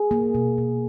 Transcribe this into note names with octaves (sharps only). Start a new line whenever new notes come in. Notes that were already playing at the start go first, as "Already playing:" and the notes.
Already playing: G#4
A#3
B2
B2